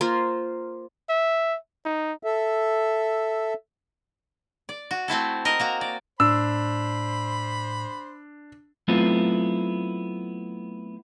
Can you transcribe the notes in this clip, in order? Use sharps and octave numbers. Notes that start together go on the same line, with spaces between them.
A#3 F4 C5
E5
D#4
A4 E5
D5
F#4
A3 C4 E4 A4
A#4 D#5
A#3 F#4 A#5
D5
A2 D4 C5 B5 E6
F#3 A3 B3 C4 E4 F4